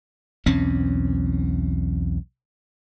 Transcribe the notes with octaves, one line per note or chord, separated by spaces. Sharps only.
B1 E2 C4 C#4